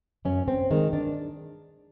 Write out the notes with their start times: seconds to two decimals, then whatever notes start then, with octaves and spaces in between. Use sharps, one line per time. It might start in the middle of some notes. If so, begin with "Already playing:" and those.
0.25 F#2 C#4
0.48 C4
0.71 D#3 G#3
0.93 D4